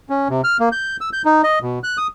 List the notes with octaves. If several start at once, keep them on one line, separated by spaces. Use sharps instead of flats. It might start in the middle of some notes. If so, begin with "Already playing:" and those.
C#4
C3
F6
A#3
G6
E6
G6
D#4
D#5
B2
F#6
D#6